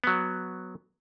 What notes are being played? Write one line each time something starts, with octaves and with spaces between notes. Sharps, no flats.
F#3 B3